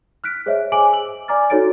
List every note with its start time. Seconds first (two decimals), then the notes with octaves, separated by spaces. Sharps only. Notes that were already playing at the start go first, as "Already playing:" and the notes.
0.24 F6 F#6 B6 D7
0.46 G#4 C5 C#5 D#5 E5
0.72 G#4 C5 G#5 D6 D7 F#7
0.93 E6 F#7
1.28 D5 G#5 A#5 D6 F6 A6
1.50 D#4 F#4 A4 C#5 A6 D7